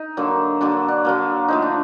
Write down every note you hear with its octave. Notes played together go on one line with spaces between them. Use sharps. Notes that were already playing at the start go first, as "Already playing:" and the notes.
Already playing: D#4
D3 F#3 A#3
D3 F#3 A#3 D4
D4
D3 F#3 A#3
D3 F3 A3 D#4
D4